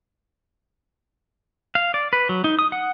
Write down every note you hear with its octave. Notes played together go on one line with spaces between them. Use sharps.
F5
D5
B4
F#3
D#4
D#6
F#5